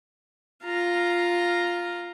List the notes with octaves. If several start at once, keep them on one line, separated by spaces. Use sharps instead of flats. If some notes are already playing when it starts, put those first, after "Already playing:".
F4 A#5